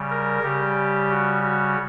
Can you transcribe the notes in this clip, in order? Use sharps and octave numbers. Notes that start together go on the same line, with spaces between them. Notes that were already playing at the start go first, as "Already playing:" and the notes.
Already playing: C#3 G3
A#4
C#3 G3 G4
F#4
F#4